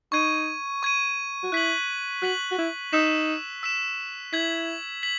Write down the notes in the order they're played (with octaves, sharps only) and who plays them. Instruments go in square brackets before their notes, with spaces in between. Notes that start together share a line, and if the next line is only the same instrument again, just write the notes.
[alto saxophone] D#4 [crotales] C#6 G#6 D#7
[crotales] C#6 G#6 D#7
[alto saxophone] F#4
[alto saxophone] E4 [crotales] F#6 B6 F#7
[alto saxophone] F#4 [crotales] F#6 B6 F#7
[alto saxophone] F#4
E4
[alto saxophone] D#4 [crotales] E6 B6 E7
[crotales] E6 B6 E7
[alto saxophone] E4 [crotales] G#6 B6 F#7
[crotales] B6 F#7